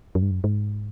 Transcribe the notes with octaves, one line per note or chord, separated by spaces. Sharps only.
F#2
G2
F#2
G#2